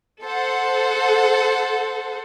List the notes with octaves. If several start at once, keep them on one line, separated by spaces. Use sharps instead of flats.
A4 C5 F#5